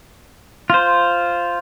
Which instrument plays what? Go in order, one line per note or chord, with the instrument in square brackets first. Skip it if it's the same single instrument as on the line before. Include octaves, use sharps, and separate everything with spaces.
[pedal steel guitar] F4 C5